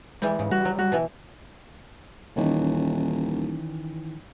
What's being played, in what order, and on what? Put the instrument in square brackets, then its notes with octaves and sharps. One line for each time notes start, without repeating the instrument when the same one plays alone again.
[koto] E3 G3 [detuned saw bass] G#3
[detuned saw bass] G#2 [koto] C#3
[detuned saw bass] G3 [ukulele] F#4
[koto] F#3
[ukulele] F#4
[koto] B2 E3
[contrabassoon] D#1 [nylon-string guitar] D#3 E3 C#4